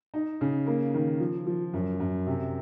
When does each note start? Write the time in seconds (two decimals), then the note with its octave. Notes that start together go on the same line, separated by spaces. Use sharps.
0.14 D#4
0.41 C#3
0.67 A#3
0.94 D#3
1.20 F3
1.47 F3
1.74 F#2
2.00 F#2
2.27 C3